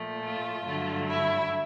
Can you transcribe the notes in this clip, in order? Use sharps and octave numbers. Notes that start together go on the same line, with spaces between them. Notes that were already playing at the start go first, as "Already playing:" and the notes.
Already playing: A#2 F3 A3
F4
G2 D3 F#3 A3
E4